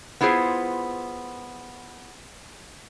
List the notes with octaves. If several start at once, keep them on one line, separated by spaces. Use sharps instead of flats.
B3 E4 F4 G#4 C5